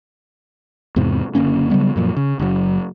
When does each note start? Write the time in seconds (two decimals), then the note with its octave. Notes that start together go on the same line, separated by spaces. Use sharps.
0.96 E2 G#2 C3
1.35 F#1 D3 A#3 C#4
1.70 C#3 F#3 G3 B3
1.96 F#2 A#2 F3
2.17 C#3
2.39 F#1 F#3